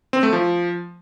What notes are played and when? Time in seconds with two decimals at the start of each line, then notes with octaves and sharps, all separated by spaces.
0.13 C4
0.23 A3
0.33 F3